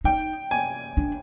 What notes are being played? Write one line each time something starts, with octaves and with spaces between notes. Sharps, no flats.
D#4 G5
G#5
D4